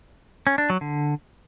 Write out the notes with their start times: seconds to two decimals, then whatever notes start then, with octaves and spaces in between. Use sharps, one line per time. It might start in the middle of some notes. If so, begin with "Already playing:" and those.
0.47 C#4
0.58 D4
0.70 F#3
0.81 D3